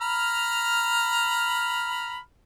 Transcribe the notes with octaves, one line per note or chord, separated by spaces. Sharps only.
A#5 B5 F6